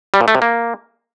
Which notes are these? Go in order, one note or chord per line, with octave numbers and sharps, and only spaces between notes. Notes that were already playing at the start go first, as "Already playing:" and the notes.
G3
A#2
A3
C3
A#3